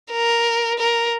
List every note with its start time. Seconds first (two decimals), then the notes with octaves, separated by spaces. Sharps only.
0.12 A#4
0.79 A#4